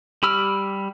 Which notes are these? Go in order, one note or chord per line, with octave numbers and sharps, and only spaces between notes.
G3 G4 B5 E6 F6